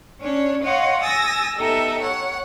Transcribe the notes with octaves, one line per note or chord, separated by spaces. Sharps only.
C#4 D4 C#5
C#5 D#5 F5 F#5 C6
G#5 D#6 E6 A6 A#6
B3 D#4 G4 A4 D#5 E5
C#5 F#5